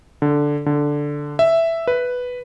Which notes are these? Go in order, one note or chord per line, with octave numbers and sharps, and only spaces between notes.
D3
D3
E5
B4